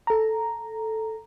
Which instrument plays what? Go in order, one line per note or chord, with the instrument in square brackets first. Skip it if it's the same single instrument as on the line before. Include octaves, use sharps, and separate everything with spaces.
[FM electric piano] A4 A#5